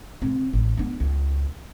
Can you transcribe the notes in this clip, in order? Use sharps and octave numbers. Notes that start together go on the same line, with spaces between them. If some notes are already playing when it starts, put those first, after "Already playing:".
C#3 C4
A1
B3 D4
C#2